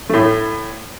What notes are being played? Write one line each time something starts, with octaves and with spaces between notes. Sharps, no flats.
A2 A3